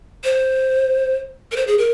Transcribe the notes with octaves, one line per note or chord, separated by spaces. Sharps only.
C5
A#4
C5
G#4
A#4